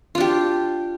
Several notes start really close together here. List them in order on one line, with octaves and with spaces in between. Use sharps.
F4 D4 G4